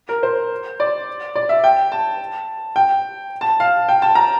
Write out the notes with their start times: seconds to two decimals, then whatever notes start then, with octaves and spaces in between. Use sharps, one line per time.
0.09 A#4
0.23 C5
0.80 D5
1.35 D5
1.49 E5
1.64 G5
1.92 A5
2.76 G5
3.41 A5
3.60 F5
3.89 G5
4.02 A5
4.15 A#5